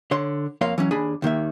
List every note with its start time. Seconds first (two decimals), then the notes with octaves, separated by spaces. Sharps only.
0.11 D3 C#5 C6
0.61 F2 A#3 C#5 F5 C6
0.78 E3 F#3 C#4
0.91 D#2 D4 G#4 G#5 B5
1.22 D#2 D#3 A#3 E5